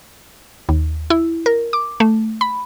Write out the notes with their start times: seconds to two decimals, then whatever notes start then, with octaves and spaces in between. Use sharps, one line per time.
0.69 D#2
1.10 E4
1.46 A#4
1.73 D6
2.00 A3
2.41 B5